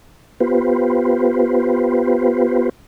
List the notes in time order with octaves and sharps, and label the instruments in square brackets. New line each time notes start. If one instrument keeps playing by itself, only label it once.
[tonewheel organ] B3 F4 G4 B4 C5